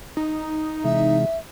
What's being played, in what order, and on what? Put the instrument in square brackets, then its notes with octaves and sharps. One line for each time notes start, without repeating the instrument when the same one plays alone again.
[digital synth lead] D#4
[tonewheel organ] C3 E3 G#3 [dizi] E5